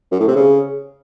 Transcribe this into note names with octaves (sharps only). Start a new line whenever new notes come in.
F#2
A2
C3
C#3